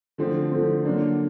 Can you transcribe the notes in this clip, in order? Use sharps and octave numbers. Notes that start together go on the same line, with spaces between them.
D3 F3 A3 C4
D3 F3 A3 C4
D3 F#3 A#3 D4